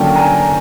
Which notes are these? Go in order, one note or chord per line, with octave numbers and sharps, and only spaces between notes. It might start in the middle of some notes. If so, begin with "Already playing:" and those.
Already playing: D3 F#3 A#3 C#4 G5 A5
G#5 A#5